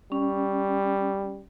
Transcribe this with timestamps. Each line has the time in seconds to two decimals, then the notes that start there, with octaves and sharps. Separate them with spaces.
0.12 G3 C#4